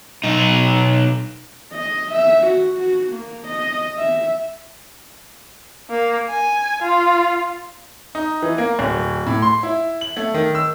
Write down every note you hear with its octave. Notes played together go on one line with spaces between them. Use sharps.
B1 D#4
D#5
E5
F#4
F#4
A#3
D#5
E5
A#3
G#5
F4
D#4
E3
A#3
D1
A2
C6
E4
F#7
A3
D#3
E6